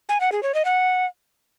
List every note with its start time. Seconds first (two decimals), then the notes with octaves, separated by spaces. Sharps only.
0.09 G#5
0.20 F#5
0.32 G#4
0.43 C#5
0.54 D#5
0.65 F#5